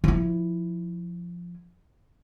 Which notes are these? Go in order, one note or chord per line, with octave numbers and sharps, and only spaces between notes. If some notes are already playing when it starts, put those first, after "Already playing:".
F3 E4